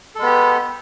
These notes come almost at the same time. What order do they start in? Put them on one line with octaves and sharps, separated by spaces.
A4 G#3 B3 G4